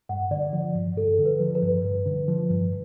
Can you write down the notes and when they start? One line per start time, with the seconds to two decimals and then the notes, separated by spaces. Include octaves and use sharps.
0.09 G2 F#5
0.31 D3 D5
0.53 F3
0.75 G2
0.96 G2 A4
1.18 D3
1.25 B4
1.40 F3
1.55 B4
1.62 G2
1.85 G2
2.06 D3
2.28 F3
2.50 G2